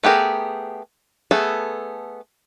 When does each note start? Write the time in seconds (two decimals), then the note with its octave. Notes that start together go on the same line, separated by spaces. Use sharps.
0.03 A3 B3 G4 G#4 A#4
1.31 A3 B3 G#4 A4